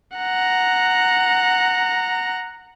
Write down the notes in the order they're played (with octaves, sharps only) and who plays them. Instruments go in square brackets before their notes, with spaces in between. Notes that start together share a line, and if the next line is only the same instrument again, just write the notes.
[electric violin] F#5 A#5